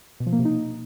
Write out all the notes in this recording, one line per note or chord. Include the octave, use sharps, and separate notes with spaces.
B2
F3
A#3
C3
D#4